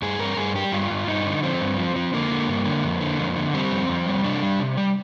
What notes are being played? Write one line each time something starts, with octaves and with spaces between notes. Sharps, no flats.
G2 G#4
G2 A#4
G2 G#4
G3 G4
G2 F4
G2
G2 D#4
D3
F3 C4
G2
F3
F3
D3 A#3
D3
G2
D3
F2
D3
F2
D3
G3 C4
F2
F2
G3
C3 D4
G3
C3
G3